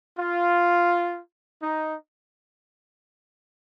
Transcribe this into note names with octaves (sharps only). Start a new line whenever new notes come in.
F4
D#4